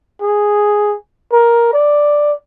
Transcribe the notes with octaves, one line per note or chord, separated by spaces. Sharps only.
G#4
A#4
D5